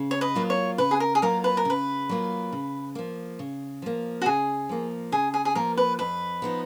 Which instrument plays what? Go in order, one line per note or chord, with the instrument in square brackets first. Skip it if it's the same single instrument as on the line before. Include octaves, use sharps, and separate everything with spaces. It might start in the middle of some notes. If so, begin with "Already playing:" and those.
Already playing: [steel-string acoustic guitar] C#3
[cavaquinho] C#5
B4 D#5
[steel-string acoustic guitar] F#3 A#3 F4
[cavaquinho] C#5
[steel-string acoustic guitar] C#3 [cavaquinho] B4
[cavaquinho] G#4
A#4
G#4
[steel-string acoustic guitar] F#3 A#3 F4 [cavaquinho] A#4
[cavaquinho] B4
A#4
[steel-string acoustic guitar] C#3 [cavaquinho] B4
[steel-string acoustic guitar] F#3 A#3 F4
C#3
F3 A#3
C#3
F3 A#3
[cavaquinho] F#4
[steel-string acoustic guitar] C#3 [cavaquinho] G#4
[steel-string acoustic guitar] F3 A#3
[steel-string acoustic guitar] C#3 [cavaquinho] G#4
[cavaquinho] G#4
G#4
[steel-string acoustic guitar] F3 A#3 [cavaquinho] A#4
[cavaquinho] B4
[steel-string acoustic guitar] F2 [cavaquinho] B4
[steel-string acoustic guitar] F3 B3 D#4